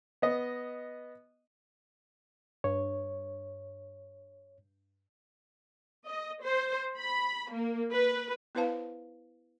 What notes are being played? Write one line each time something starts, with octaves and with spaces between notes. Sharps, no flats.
B3 D#5
G2 C#5
D#5
C5
B5
A#3
B4
B3 E4 B4 C5 F5 A5